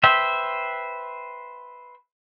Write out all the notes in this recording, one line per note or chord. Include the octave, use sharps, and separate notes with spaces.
B4 C5 E5 G5